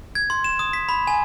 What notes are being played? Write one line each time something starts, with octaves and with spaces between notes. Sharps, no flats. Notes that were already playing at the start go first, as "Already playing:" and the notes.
G#6
C6
E7
D#6
B6
B5
G#5